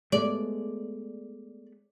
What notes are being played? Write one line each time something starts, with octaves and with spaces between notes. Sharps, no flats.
G#3 A3 B3 D5